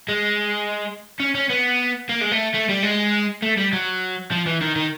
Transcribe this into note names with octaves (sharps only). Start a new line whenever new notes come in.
G#3
C#4
C#4
B3
A#3
G#3
A3
A3
G3
G#3
A3
G3
F#3
F3
E3
D#3
D#3